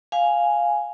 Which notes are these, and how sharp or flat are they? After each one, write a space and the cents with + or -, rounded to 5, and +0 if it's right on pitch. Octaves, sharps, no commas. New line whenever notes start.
F5 +0 G#5 +0